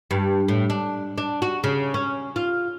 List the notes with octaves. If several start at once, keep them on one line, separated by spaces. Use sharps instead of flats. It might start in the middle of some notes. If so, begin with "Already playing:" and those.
G2
A2
D4
D4
F#4
C#3
C#4
F4